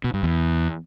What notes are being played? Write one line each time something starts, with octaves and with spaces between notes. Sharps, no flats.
B2
G2
E2